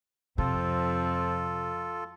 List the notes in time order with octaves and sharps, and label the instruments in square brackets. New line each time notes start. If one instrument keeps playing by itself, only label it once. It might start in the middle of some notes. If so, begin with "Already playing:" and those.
[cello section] F2 [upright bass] C3 [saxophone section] F3 C4 [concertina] F4 A4